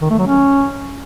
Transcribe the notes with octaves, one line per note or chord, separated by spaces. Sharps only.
D#3
A3
F#3
C#4